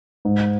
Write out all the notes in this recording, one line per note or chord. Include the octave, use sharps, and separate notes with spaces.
G#2